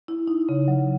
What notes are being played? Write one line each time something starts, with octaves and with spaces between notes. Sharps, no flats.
E4
D#4
C#3
F#3